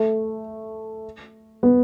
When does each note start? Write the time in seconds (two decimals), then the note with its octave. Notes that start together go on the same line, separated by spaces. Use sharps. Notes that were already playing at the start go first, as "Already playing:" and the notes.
Already playing: A3
1.63 B3